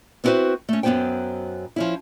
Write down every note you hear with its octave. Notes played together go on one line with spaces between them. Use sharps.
B3 C4 E4 F#4 B4 C5
A3 C#4
F#2 F#3 B3 E4 C5 G5
F3 C#4 E4